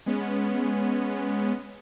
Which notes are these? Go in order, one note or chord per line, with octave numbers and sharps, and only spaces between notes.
G#3 B3 C#4